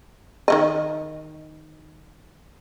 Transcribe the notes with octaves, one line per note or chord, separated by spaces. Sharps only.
D#3 A3 D#5